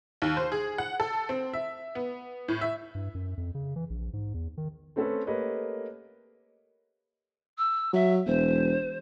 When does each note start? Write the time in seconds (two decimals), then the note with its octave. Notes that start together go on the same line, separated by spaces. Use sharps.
0.22 D#2
0.37 C5
0.52 G#4
0.78 F#5
1.00 A4
1.29 C4
1.53 E5
1.95 B3
2.48 A2
2.61 E5
2.95 G2
3.15 F#2
3.37 F2
3.55 C#3
3.76 E3
3.90 A#1
4.13 G#2
4.34 E2
4.57 D#3
4.96 A3 C4 C#4 A4 B4
5.27 A3 A#3 G4 B4 C#5 D#5
7.58 E6
7.93 F#3 E5
8.26 E1 C5